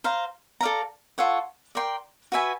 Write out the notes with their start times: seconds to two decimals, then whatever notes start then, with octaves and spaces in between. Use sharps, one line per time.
0.04 C5 F5 A#5
0.61 A4 D5 F5 A#5
1.18 F4 A4 C#5 F#5
1.75 A#4 D5 G5 C6
2.32 F#4 B4 E5 G#5